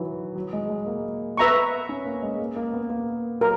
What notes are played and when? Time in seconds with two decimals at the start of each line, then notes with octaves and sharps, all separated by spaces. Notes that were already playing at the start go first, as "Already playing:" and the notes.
Already playing: D#3 E3 F#3
0.36 F#3
0.53 G#3
0.70 G#3
0.87 A#3
1.37 B3 B4 E5 A#5 C#6
1.89 C#4
2.06 A#3
2.22 G#3
2.40 A#3
2.56 A#3
2.73 B3
2.90 A#3
3.41 F#3 A#4